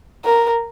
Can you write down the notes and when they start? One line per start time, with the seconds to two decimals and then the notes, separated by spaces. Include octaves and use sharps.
0.25 A#4